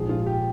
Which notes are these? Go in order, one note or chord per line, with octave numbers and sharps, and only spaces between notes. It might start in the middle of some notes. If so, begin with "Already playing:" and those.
Already playing: A#1 G#2 F3 G#4
F4
G4